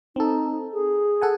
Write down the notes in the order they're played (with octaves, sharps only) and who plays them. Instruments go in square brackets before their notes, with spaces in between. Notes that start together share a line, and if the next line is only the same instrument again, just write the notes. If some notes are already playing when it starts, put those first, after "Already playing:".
[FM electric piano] C4 A4 [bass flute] D#4
[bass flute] G#4
[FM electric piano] A4 F#5 G#5